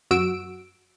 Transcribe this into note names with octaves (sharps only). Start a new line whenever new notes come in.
F#2 F#4 E6 D7